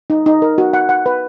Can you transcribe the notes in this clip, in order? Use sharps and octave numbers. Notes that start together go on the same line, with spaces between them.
D#4
D#4
A#4
F#4
F#5
F#5
B4